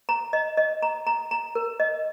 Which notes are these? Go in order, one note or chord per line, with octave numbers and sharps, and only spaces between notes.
A#5
D#5
D#5
A#5
A#5
A#5
A#4
D#5